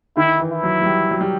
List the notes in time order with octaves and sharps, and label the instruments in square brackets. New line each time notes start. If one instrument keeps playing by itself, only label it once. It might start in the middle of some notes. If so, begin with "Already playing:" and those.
[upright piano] D#3 [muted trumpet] E4
[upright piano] E3
[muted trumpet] E4
[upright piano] F#3
F#3
G3
F#3
G3